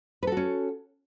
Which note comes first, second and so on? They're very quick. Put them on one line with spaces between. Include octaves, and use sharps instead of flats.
B4 A4 F#4 C#4